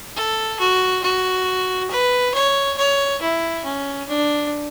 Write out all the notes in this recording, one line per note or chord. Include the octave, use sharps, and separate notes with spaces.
A4
F#4
F#4
B4
C#5
C#5
E4
C#4
D4